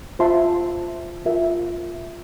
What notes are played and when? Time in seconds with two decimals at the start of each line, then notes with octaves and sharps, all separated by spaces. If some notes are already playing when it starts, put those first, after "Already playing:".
0.19 F4 C5 E5 A5 C6
1.26 F4 A#4 E5